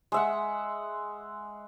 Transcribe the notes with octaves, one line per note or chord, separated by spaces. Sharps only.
G#3 E5 F#5